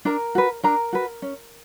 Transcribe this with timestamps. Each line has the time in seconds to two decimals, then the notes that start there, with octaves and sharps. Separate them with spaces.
0.05 D4 A#4 A#5
0.35 F#4 B4
0.64 D4 A#4 A#5
0.93 F#4 B4
1.22 C#4